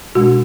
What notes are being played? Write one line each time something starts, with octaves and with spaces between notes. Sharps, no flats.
B2 G#3 D4 F#4